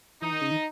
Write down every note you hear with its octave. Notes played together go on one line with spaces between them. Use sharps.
E3 D#4
D#3
C#3
D#3